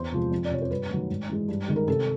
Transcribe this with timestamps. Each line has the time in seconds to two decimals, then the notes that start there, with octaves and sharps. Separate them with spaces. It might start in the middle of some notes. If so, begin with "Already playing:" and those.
Already playing: E2 C5
0.12 C3 F3 G#3
0.31 F2
0.45 D5
0.51 C3 F3 C#5
0.62 C5
0.71 G2 B4
0.90 D#3 F#3 A3
1.10 G#2
1.29 E3 G#3
1.48 G2
1.68 D#3 G#3
1.76 A#4
1.88 C3 A4